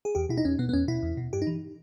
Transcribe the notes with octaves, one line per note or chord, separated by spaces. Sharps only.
G#4
E2 G4
B2 E4
D#4
E2 C#4
B2 B3
B3
E2 C#4
B2 E4
E2
B2
G2 G4
D#4
E3